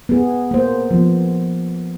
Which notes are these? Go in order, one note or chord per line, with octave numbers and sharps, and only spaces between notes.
B3 G#4
A#3 C5
F3 B3